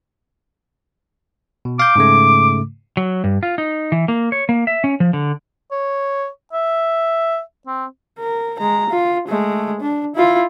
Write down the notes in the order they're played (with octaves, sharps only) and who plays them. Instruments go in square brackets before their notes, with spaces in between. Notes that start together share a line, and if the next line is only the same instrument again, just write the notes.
[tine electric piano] B2
[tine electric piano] F5 G6 [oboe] D6
[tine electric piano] G#2 C#3 A3
[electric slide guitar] F#3
G2
F4
D#4
E3
A#3
C#5
A#3
E5
C#4
F3
D3
[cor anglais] C#5
E5
C4
[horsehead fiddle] A#4
G#3 A#5
F4
G#3 A3
D4
E4 F4